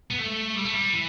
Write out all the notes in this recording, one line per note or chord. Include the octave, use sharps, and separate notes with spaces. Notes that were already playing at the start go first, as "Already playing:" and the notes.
B3
A3
G3
A3
G3
E3